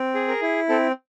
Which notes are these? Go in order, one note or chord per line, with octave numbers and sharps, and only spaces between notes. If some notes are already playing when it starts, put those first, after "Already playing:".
Already playing: C4
G#4
A#4
E4
C4 A4